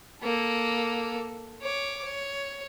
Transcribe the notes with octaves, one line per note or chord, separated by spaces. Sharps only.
A#3 A4
C#5 D6
C#5